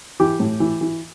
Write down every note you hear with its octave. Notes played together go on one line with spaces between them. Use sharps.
E3 G4
A2
E3
E3